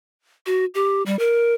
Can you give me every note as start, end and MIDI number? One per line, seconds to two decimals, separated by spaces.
0.46 0.65 66
0.74 1.03 67
1.06 1.18 55
1.19 1.54 70